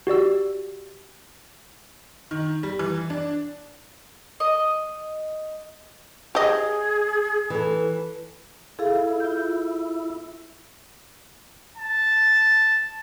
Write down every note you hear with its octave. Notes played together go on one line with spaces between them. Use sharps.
F#4 G4 D5 E6
D#3
G3
E3
D4
D#5
G4 G#4 D#5
E3 A4
E4 G#4 A4 F5
F4 G6
A5